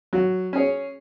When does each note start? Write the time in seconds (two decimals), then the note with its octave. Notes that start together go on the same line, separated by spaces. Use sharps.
0.13 F#3 F#4
0.53 C#4 G#4 C#5